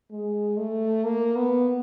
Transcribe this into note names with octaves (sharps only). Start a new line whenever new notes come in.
G#3
A3
A#3
B3